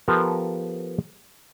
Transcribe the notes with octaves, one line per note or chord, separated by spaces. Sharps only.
F3 B3 G4 A4 A#4